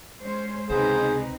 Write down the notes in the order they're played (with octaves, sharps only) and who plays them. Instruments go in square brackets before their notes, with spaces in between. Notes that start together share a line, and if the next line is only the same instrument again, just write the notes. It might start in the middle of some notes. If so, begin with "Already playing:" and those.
[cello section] G#3 C#4 C5
[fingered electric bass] C#2 C3 [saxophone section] B3 C5 [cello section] C4 D#4 B4 [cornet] G#4